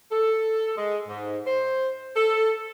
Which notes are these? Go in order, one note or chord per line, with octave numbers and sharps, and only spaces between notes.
A4
G#3
G#2
C5
A4